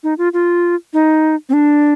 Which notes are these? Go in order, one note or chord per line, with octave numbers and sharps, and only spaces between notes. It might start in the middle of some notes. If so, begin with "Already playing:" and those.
D#4
F4
F4
D#4
C4
D4